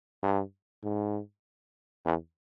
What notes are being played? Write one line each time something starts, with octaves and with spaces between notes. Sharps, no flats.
G2
G#2
E2